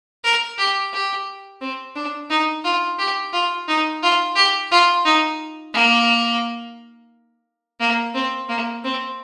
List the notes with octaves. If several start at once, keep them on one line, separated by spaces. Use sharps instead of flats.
A#4
G4
G4
C4
D4
D#4
F4
G4
F4
D#4
F4
G4
F4
D#4
A#3
A#3
C4
A#3
C4